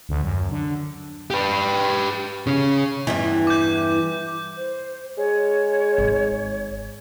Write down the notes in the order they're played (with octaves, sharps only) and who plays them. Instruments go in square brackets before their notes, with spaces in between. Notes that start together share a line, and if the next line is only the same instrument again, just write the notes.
[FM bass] D2
F#2
D3
[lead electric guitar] G4 B4
C#3 C#4
[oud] E2 G2 E3
[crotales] D6 G6
[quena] C5
[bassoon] G#3 [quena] C#5
[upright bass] G#1